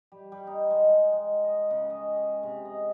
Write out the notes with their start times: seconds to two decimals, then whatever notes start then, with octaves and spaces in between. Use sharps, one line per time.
0.12 G3
0.32 G3
0.47 D#4
0.70 G#3
1.12 G#3
1.44 D#5
1.71 C#3
1.90 D#5
2.16 G#4
2.43 C3
2.65 D#5